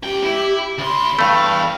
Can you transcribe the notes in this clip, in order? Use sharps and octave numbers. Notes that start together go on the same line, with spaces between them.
C#2 G4 G5
E4
D2 B5 C6
E2 G2 A3 F5